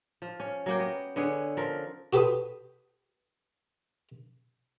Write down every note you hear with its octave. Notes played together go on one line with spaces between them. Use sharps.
F3
C#4
F#3 A#3 G5
B3
D3 B3 C#4 G#4
F3 A#4
F#4 G4 A4 B4 C5 D#6